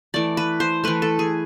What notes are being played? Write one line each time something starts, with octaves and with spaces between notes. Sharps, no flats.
E3 A3 D5
B4
C5
E3 A3 B4
A4
G#4